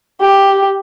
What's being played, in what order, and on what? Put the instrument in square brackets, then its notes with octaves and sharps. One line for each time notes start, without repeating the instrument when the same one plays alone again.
[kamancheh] G4